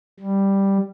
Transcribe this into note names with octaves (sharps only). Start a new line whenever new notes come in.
G3